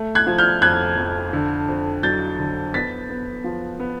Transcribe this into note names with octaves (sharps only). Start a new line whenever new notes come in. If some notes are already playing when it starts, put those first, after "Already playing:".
Already playing: A3
F#6 G#6
F3
F6 G6
F2 F#6 G#6
F2
D3
F2
F#3 G6 A6
D3
B3 A6 B6
B3
F3
B3